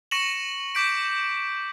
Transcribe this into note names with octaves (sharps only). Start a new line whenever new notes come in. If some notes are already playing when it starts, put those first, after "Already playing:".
C#6 A#6 C#7 E7 F#7
D6 G6 B6 D7